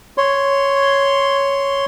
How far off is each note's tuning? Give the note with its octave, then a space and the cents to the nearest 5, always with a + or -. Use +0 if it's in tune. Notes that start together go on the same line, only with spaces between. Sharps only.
C#5 +0 C6 +0